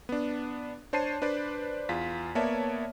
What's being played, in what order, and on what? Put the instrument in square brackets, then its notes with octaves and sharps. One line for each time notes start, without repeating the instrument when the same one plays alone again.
[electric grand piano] B3 D4
D4 C5 C#5 A5 C7 D#7
D4 B4 C5 D5
E2 F4 B6
A#3 B3 C#5 D5 E5 A5